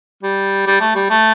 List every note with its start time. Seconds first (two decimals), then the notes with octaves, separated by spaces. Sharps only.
0.23 G3
0.67 G3
0.81 A3
0.95 G3
1.10 A3